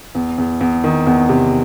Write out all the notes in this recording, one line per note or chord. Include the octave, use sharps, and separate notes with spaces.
E2
E2
E2
D#3
E2
C3